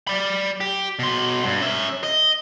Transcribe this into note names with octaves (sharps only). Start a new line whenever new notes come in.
D5 B5
G4
B2 C6
G2
C#4 E5
D#5